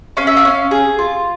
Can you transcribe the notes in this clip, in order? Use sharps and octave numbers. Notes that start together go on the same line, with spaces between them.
C#4 F5
E5
F5
C#4
G#4
F4